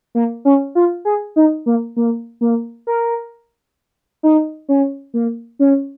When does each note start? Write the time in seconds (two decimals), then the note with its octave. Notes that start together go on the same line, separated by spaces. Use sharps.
0.15 A#3
0.45 C#4
0.75 F4
1.05 G#4
1.36 D#4
1.66 A#3
1.96 A#3
2.41 A#3
2.87 A#4
4.23 D#4
4.69 C#4
5.14 A#3
5.59 C#4